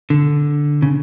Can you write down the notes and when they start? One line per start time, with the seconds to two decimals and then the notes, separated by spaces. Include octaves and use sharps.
0.10 D3
0.82 C#3